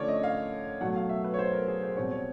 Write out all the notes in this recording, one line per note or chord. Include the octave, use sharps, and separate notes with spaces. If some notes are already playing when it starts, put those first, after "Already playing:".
Already playing: D3 F3 A3 C#4 C#5 D5
D#5
F5
B2 F#3 A3 F#5
F5
E5
B4
C#5
C5
A#4
G#4
C5
B2 G3 C4 C#5
C#5